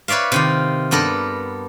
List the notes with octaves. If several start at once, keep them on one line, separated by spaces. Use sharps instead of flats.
B4 C#5 D5 E5 F5
C3 D#3 F4
G2 B3 A4 A#4 D5